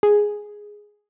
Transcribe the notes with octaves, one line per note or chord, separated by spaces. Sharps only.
G#4